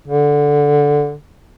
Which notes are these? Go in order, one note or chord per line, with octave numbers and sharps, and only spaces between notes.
D3